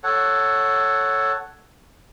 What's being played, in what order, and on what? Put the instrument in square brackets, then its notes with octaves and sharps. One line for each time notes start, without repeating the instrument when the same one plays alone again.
[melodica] A4 C#5 F#5